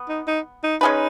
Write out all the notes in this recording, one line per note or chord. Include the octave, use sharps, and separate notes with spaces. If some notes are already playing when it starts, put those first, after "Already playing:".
Already playing: B3
D#4
D#4
D#4
G#3 C#4 D#4 G#4 B4